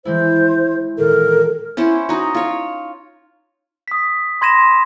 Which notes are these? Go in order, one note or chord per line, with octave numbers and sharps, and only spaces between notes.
E3 G#3 E4 C5
A#2 D#3 A4 A#4
C#4 E4 C5 F#5
D#4 F#4
F4 C#5
D#6 B6
B5 C6 G#6 A#6 D#7 E7